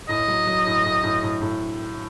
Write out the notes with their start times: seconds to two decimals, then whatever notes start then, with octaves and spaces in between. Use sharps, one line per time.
0.09 A2 D#5
0.28 F#3
0.47 F#3
0.66 A2
0.85 A2
1.04 A2
1.23 A2
1.42 A2